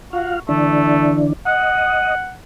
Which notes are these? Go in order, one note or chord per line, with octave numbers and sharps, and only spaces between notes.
F4 F#4 F5
D3 E3 A3 D4
D#5 F#5